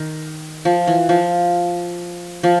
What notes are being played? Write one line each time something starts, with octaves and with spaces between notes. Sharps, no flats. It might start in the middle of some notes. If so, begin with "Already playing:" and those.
Already playing: D#3
F3
E3
F3
F3